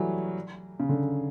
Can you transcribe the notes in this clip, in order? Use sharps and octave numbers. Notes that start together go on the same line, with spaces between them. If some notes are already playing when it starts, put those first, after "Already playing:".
Already playing: E3 F#3 G3 A3
C#3
D3